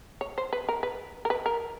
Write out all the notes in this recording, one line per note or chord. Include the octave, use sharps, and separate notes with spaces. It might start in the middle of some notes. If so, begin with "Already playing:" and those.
C#5
C5
B4
A#4
B4
A#4
B4
A#4